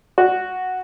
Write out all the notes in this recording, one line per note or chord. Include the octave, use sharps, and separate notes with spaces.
F#4